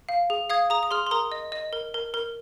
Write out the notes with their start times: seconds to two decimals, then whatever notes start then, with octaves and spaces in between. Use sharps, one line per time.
0.09 F5
0.30 G#4
0.50 F5 D#6 G#6
0.70 G#4 A#5 D#6
0.83 D#6
0.91 G#4 C6 F6
1.07 C6
1.11 A#4 A#5 D#6
1.32 D#5
1.52 D#5
1.73 A#4
1.94 A#4
2.14 A#4